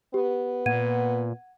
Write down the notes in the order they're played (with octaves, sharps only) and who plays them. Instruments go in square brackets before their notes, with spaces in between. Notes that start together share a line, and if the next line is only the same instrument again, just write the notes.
[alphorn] B3 [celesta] G4
[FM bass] A#2 [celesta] F#5 G#6 D#7